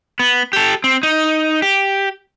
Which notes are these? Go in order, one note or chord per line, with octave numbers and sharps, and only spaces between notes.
B3
G4 A4
C4
D#4
G4